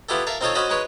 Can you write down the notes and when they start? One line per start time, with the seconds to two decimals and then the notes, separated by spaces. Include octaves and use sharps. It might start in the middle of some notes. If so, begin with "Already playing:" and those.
0.09 B3 E4 F4 G4 A4
0.27 A#4 E5 F5 A5
0.41 C4 D#4 F4 A4 C5 C#5
0.55 C#4 F#4 C5 D#5 B5
0.70 G#3 D#4 B4 C#5